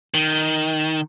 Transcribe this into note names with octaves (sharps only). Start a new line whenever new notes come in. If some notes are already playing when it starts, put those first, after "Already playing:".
D#3